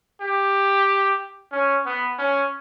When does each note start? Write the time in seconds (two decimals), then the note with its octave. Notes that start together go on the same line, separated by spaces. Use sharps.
0.21 G4
1.52 C#4
1.86 B3
2.19 C#4